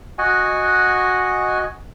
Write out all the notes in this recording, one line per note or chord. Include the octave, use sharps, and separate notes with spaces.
F#4 D#5 F#5 G#5